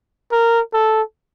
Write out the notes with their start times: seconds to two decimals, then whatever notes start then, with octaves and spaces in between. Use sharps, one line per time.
0.32 A#4
0.73 A4